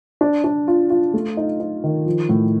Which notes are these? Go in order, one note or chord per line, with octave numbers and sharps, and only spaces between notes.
D4
D4
F4
F4
A3
D#4
D#4
D#3
F3
A2